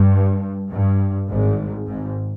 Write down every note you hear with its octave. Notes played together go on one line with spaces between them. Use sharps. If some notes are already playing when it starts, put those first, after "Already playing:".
Already playing: G2
G2
G#1 G#2
G#1 G#2